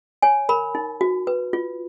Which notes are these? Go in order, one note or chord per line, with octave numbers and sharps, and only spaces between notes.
C#5 G#5
A#4 B5
D#4
F#4
B4
F4